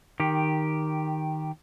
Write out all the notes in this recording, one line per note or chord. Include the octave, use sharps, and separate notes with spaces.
D#3 G4